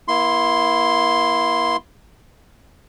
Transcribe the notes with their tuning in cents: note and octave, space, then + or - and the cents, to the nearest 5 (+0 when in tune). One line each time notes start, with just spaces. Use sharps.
A#3 +40 E4 +0 C6 +0